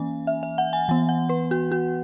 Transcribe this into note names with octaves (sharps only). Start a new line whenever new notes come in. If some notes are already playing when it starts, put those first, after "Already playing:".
Already playing: E3 A#3 C#4 G#5
E5
E5
F#5
G#5
E3 B3 G#5
F#5
B4
F#4
F#4